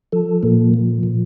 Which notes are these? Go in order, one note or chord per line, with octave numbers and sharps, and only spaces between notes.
F3 A4
A#2 A#3
F3
A#2